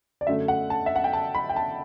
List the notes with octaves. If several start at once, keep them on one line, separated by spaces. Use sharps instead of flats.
D5
F#2 D3 F#3 A3 E5
F#5
A5
E5
F#5
G5
A5
B5
G5
A5